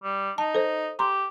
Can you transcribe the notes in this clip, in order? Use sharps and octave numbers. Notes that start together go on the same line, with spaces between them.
G3
D#4 A5
A4 C5
G4 A#5 C6